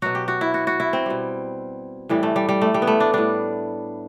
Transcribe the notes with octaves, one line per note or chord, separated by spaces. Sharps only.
B2 F#3 F#4
G4
F#4
E4
F#4
F#4
E4
C4
B2 G3
A2 E3 G3
A3
G3
G3
A3
G3
B3
A3
D4
A2 G3 D4